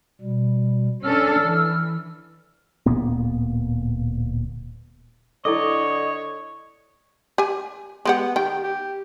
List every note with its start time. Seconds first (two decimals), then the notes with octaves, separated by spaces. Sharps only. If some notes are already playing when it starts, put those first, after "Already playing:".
0.21 B2 G3
1.04 C#4 D4 A4 E6 F6
1.40 E3
2.86 D1 A#2 A#3 B3
5.45 D3 E4 A4 C#5 D#5 D6
7.38 G4 G#5
8.05 G#3 B3 G4 F#5
8.36 D#3 G4 G5
8.64 G4